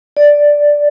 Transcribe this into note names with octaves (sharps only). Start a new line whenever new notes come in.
D5